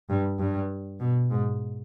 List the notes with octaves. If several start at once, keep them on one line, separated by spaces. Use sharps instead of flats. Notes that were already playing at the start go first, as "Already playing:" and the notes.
G2
G2
B2
G#2